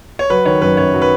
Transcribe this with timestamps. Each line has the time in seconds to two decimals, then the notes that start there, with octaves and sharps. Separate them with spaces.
0.19 C#5
0.30 F#3 B4
0.46 D#3 C#5
0.61 F#2 B4
0.77 F#2 C#5
0.94 F#3
1.01 B4